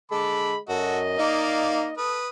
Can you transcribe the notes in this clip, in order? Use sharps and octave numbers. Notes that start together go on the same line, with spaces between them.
D3 G#3 A4 B5 D6
F#2 F#4 A4 D#5
A#3 D#4 D5 F5
A4 B4 D#6